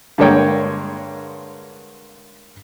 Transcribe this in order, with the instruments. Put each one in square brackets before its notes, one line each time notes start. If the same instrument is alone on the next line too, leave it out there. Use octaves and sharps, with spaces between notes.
[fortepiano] G2 D3 G#3 A#3 C#5 G5